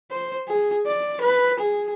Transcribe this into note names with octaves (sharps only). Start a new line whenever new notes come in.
C5
G#4
D5
B4
G#4